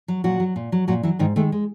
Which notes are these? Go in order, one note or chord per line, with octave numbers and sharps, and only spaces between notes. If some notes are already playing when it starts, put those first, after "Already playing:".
F#3
A#2 F#3 F#4
F#3
A#2
F#3
A#2 F#3 F#4
E3 F#3 E4
G#2 D#3 D#4
D#3 G#3 A3
G#3